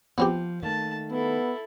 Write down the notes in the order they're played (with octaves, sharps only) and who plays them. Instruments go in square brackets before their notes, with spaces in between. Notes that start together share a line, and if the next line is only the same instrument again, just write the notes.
[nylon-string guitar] F3 [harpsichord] B3 C4 G4
[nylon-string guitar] D#3 A3 A#3 [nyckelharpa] A5
[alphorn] B3 [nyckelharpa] E4 A4